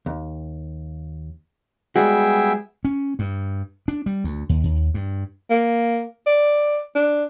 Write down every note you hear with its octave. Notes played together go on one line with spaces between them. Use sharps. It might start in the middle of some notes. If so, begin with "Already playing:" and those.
D#2
G3 G#3 B3 F#4 G#4 E5 G5
C#4
G2
D4
G3
D2
D#2
D#2
G2
A#3
D5
D4